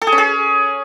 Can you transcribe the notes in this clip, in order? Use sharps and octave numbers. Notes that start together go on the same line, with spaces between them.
A4
G#4
C#4
G#4